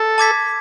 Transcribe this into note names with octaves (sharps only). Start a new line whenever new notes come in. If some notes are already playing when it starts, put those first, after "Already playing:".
Already playing: A4
A5 D6 G#6 B6